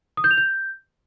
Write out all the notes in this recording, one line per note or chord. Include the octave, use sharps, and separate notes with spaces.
D#6
G6
F7
G6